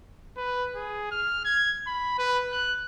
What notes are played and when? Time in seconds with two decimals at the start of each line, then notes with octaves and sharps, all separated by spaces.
0.37 B4
0.76 G#4
1.11 F6
1.45 G#6
1.87 B5
2.18 B4
2.52 F#6